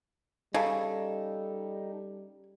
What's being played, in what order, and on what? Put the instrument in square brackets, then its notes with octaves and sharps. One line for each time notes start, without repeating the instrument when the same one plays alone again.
[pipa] C#3 [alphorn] G3 [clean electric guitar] D#4 A4